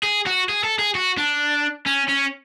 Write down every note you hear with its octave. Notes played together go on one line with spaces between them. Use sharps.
G#4
F#4
G#4
A4
G#4
F#4
D4
C#4
C#4